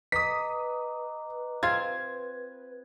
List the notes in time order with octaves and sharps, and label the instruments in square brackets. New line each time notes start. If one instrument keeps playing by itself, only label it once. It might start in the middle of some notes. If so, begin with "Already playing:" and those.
[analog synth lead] B4 [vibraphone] D#5 A#5 D6 [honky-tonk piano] D#6 B6
[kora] C4 F4 F5 [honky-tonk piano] G#6